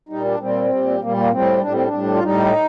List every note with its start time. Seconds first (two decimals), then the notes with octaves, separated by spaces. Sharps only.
0.09 A#2 G3 D#4
0.25 D4
0.40 A#2 G3 C4
0.70 A#2 G3
1.01 A#2 G3 A#3
1.17 A#3
1.32 A2 G3 C4
1.61 A2 G3 D4
1.73 C4
1.85 D4
1.92 A2 G3
2.14 F4
2.23 A2 G3 D#4